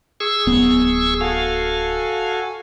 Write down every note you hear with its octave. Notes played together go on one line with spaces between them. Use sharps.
G#4 C#6 E6
D1 B3
F#4 A4 F5 G#5